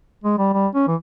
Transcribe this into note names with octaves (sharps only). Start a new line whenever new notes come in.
G#3
G3
G3
C#4
E3